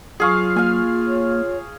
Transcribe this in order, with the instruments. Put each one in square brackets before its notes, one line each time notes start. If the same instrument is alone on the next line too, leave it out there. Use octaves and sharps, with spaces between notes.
[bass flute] F#3 [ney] F4 [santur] G#4 F5 C#6
[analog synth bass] A#3 [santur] F5 G#5
[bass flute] C#5